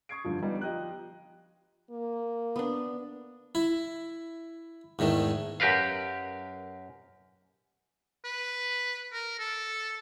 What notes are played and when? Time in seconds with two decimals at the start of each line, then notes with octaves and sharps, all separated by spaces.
0.09 C#6 D#6 G#6 C7 D7
0.24 G2 D3 E3 F3
0.42 F3 G3 B3 D#4
0.61 F3 G4 D#5 G5 A#5 F#6
1.91 A#3
2.56 B3 D4
3.55 E4
4.99 E2 G#2 D#3 A3
5.60 F#2 G4 A#4 B4 F5
8.24 B4
9.12 A#4
9.39 A4